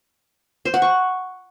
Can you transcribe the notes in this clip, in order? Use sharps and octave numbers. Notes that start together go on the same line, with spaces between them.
C5
F#5
C#6